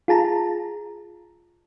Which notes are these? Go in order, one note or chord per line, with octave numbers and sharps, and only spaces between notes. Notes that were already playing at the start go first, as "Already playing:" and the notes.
F4 G#4 A5 A#5